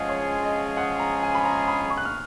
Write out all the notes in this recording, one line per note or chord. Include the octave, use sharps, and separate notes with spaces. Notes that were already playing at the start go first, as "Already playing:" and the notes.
Already playing: F3 G#3 C#4 F4 G#4 D#5 F5 F#5
C#5
D#5
F#5
A#5
G#5
B5
A#5
B5
C#6
F#6
F6